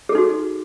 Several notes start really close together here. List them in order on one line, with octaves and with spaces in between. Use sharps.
G#4 A4 D#4 F#4